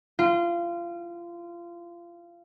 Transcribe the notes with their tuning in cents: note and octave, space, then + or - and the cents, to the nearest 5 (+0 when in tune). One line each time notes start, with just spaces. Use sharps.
F4 -25